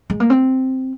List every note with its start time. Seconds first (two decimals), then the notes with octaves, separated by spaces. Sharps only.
0.10 G#3
0.20 A#3
0.30 C4